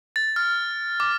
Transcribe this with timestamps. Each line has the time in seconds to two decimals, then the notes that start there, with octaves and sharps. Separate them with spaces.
0.16 A6
0.36 F6
1.00 D6